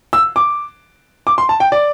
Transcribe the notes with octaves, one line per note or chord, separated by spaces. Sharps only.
E6
D6
D6
C6
A5
G5
D5